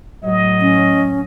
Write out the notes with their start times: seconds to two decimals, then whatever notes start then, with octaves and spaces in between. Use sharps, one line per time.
0.24 A2 F#3 D#5
0.62 C#4